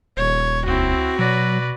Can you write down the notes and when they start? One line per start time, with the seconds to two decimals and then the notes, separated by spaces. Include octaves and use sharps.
0.17 D#1 C#5
0.67 C#2 C4 E4 F#4
1.19 B2 F#3 B4 D5 A#6